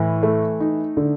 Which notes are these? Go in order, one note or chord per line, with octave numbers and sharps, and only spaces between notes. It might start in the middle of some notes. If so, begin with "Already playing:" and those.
Already playing: A2 E3
A3
D#4
D3